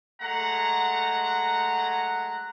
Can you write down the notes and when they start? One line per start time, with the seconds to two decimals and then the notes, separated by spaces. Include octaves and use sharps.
0.22 F#3 G#3 A3 F#5 A#5